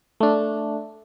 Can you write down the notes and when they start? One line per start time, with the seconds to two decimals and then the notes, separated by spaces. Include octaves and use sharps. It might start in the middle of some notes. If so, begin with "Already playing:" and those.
0.20 A3 D4